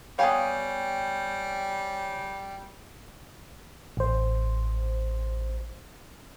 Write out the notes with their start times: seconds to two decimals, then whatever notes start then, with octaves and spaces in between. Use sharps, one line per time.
0.19 G3 B3 C#5 F5 G5 G#5
3.97 A1 C5